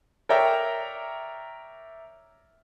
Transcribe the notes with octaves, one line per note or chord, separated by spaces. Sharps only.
A#4 C#5 D5 E5 G5 A#5